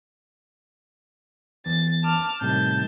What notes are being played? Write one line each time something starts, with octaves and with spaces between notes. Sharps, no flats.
E2 A6
A5 D6 F6
A2 C3 D#3 G3 A5 G6